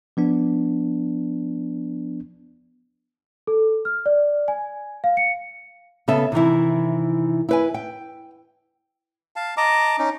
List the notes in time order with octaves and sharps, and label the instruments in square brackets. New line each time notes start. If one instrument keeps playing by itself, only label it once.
[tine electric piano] F3 B3 D4
[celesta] A4
F6
D5
G#5
F5
C#7
[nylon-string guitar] C#3 B3 A4 E5
C3 D#3 E3 E4
E4 B4 G#5
G5
[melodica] F5 A5
D#5 A5 A#5 D6
C#4 D#4